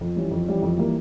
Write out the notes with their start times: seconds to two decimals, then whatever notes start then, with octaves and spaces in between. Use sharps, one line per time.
0.01 F2
0.16 E3 G3 C#4
0.31 F2
0.47 E3 G3 C#4
0.62 F2
0.77 E3 G3 A#3